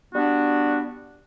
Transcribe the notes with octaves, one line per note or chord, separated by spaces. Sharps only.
G3 B3 D4 F#4